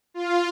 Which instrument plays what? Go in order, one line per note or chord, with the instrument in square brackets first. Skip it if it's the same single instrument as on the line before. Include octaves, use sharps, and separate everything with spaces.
[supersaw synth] F4